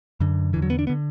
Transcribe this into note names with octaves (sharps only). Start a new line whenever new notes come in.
F#2 D3
E2 D3 E3
F#3
B3
D4
B3
D3